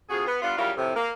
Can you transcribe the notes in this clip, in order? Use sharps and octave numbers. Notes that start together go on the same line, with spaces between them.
D2 C3 F4 F#4 G#4
B3
G3 B3 D4 F4
C#3 F#3 G3 E4 F4 A#4
F2 A2 C3
A#3